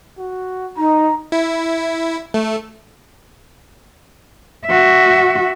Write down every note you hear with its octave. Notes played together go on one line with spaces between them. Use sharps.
F#4
D#4 A#5
E4
A3
F#4 E5